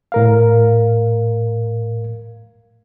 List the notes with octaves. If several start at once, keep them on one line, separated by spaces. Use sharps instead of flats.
A2 A#4 F5